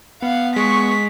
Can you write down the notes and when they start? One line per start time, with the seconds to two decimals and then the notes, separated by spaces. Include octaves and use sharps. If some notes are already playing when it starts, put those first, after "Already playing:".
0.22 B3 F5 F#5
0.56 G#3 C#6 B6